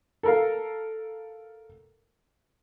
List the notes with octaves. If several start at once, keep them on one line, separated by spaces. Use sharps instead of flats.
A4 A#4 F5